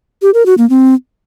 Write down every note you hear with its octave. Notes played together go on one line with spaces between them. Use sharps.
G4
A#4
F#4
A#3
C4